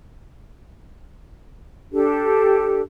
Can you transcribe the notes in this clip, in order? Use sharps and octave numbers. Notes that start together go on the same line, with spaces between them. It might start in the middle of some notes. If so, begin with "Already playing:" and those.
D4 G4 A4